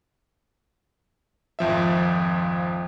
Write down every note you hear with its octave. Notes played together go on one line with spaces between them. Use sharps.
G#1 F2 F3 E5